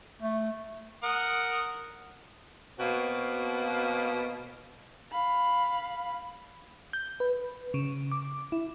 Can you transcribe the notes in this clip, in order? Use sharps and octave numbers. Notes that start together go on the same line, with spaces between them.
A3
A#4 F#5 D#6
B2 A#3 C4 F#4
F5 B5
G6
B4
C#3
D6
E4